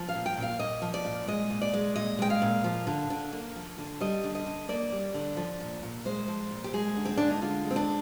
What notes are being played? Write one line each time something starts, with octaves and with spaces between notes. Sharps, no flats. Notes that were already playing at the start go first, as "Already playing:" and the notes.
Already playing: F3
F5
A#2
G5
A#2
F5
A#3 D#5
F3
D5
A#2
G#3 D#5
A#2
D5
G#3
A#2 D#5
G#3 G5
F5
A#2
F3
D3
D3
A#3
F3
D3
G3 D#5
D3
D#5
D3
A#3 D5
G3
D3
F3
A#2
A#2
G#3 C5
F3
A#2
G4
G#3 G#4
D3
C4
G#3 D4
D#4
D3 F4
G#3
C4
D4